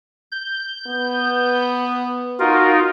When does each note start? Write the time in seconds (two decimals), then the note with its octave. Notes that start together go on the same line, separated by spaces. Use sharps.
0.32 G6
0.87 B3
2.40 D#4 F4 F#4 A#4